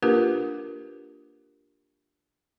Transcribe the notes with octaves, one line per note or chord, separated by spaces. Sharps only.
A#3 D4 F4 G4 A#4 B4